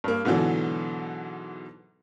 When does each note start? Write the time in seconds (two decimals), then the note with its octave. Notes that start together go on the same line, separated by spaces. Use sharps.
0.04 G2 A#3
0.25 G#2 B2 D3 E3 F#3